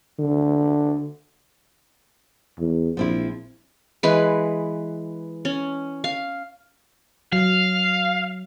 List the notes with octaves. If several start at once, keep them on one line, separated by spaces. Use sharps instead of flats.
D3
E2
A#1 F3 C4 E4
E3 G#3 B4
C#4
F5
F#3 F5